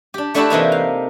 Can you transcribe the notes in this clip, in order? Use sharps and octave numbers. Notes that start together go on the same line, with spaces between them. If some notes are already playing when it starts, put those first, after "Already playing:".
D4 G4
A3 D4 E4 F#4 G4 A4
C3 E3 A#3 D#4
F5